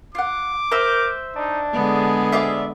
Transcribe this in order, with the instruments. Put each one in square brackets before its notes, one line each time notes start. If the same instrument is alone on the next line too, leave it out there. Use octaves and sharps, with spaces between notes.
[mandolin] F4 F#5 [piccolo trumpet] D6
[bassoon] A#4 [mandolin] C5 E5
[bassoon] D4 [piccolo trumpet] D#4
[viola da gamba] D3 G#3 B3 [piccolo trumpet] G#4
[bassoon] D2 [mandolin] F4 D5 E5